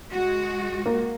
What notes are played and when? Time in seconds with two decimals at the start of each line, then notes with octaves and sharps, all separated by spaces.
0.11 G#3 F#4
0.86 A#3